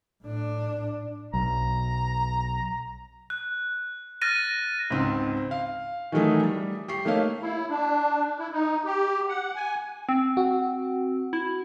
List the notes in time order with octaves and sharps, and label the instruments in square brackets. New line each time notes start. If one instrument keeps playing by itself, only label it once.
[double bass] A2 D4
[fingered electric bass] B1 [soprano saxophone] A#5
[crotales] F#6
F6 F#6 A6 A#6 D#7
[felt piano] C#2 G#2 C4
F5
D#3 E3 F#3 A3 D#4 G#4
G3
G4 C#6 C7
A3 A#3 D#4 C#5 F5
[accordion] E4
D4
E4
D#4
G4
F#5
G#5
[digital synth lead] C4
[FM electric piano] F#4
[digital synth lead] E4